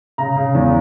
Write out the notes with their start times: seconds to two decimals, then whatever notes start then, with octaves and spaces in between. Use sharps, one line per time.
0.18 C#3 A#5
0.36 C#3
0.55 E2